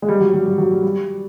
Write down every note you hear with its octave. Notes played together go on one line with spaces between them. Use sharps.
G#3
G3
F#3
F#3
G3
F#3
G3
G3